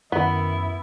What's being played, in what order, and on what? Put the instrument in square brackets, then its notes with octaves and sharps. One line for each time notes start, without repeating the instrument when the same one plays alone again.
[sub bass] F#2 [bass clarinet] D#3 [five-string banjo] B3 [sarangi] E4